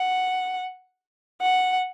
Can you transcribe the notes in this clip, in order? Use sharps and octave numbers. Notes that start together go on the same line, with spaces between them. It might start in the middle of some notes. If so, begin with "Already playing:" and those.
Already playing: F#5
F#5